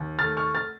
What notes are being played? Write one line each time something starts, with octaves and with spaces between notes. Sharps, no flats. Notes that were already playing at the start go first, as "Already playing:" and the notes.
Already playing: D#2
A3 F6 A6
C#6 F6
F6 A6